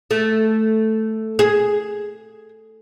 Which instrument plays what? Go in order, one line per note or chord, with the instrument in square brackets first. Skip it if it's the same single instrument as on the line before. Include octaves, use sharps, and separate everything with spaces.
[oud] A3
G#4